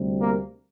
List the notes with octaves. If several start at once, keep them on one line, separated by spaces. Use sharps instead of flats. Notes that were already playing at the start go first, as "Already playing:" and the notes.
Already playing: D2 C3 G3
A#3